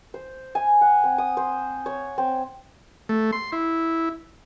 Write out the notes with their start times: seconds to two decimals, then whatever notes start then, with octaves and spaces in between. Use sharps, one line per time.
0.14 C5
0.55 G#5
0.81 F#5
1.04 C4
1.18 D#6
1.37 C5
1.86 C#5
2.18 C4
3.09 A3
3.32 C6
3.52 E4